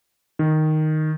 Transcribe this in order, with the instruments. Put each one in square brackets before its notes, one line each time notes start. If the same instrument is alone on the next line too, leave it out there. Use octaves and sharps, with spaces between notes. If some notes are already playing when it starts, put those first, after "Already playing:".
[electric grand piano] D#3